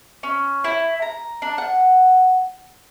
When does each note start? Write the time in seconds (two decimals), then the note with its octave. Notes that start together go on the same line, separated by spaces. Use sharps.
0.23 C#4
0.64 E4
1.02 A#5
1.42 D4
1.58 F#5